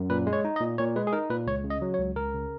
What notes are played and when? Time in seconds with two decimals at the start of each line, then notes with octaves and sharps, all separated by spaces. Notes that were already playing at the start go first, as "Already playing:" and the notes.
Already playing: F#2
0.10 A#2 B4
0.27 G#3
0.33 C#5
0.45 D#4
0.56 D#5
0.61 A#2
0.78 A#2 C#5
0.96 G#3 B4
1.07 G#4
1.13 D#4 A#4
1.30 A#2 B4
1.47 C#2 C#5
1.64 C#3
1.70 D#5
1.82 F#3
1.94 C#5
1.99 C#2
2.16 C#2 A#4
2.34 C#3